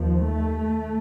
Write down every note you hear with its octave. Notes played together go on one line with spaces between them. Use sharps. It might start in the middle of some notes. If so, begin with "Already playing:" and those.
Already playing: D#2 F3
A3